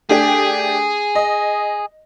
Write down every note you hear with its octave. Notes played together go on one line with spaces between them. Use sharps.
A3 D4 G4 G#4
D#5